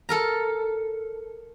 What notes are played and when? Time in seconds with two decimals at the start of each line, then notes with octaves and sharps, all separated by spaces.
0.09 A4 A#4 A#5